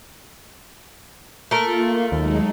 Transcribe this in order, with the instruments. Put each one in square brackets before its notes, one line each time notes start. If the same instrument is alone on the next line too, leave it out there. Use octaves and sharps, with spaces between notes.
[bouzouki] A3 A#4 [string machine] A#3 F4
[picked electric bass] D#2 [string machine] F#3 G#3 D#4